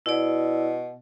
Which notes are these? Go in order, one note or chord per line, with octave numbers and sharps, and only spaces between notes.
B2 E4 D5